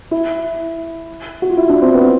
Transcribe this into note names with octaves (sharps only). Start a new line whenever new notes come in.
E4
F#4
F4
E4
D4
C4
B3